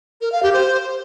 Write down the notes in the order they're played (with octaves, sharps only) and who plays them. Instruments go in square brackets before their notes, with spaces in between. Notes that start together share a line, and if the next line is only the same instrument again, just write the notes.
[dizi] A#4
F5
G4
C5